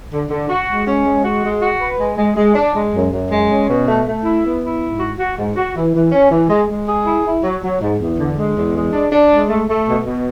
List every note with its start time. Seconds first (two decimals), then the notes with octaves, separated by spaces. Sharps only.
0.12 D3
0.30 D3
0.49 F#4
0.68 G#3
0.87 C#4
1.05 G#3
1.24 F#4
1.43 G#3
1.61 F#4
1.80 B4
1.99 G#3
2.18 G#3
2.37 G#3
2.55 D4
2.74 G#3
2.93 F#2
3.12 F#2
3.30 G#3
3.49 C#4
3.68 B2
3.86 A3
4.05 A3
4.24 E4
4.44 B3
4.62 E4
4.80 G#2
4.99 F#4
5.18 F#4
5.37 G#2
5.55 F#4
5.74 E3
5.93 E3
6.12 C#4
6.30 E3
6.49 G#3
6.68 G#3
6.87 G#4
7.06 E4
7.25 E4
7.43 F#3
7.62 F#3
7.80 G#2
8.00 E2
8.18 D3
8.37 G#3
8.56 E2
8.75 G#3
8.93 D4
9.12 D4
9.31 G#3
9.49 A3
9.69 A3
9.88 B2
10.05 B2